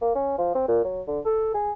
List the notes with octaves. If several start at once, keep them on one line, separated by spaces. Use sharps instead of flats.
A#3
C#4
F3
C4
A#2
F#3
D3
A4
G#4